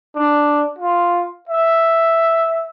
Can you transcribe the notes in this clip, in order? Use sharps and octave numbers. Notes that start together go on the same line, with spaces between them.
D4
F4
E5